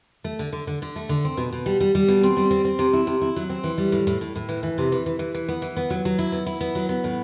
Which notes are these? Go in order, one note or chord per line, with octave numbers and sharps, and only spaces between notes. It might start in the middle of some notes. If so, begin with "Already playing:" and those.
A3
D3
D3
D3
D3
A3
D3
C4
B2
B2
G3
G3
G3
B2
C4
G3
C4
C4
C3
E4
C3
E4
F#3
C4
E3
G3
A2
A2
A2
A2
E3
E3
C3
E3
E3
E3
E3
B3
E3
B3
F#3
F#3
E4
B3
E4
B3
F#3
B3
A2